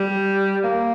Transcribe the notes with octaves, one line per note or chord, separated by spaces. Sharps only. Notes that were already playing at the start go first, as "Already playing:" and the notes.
Already playing: G3
A#3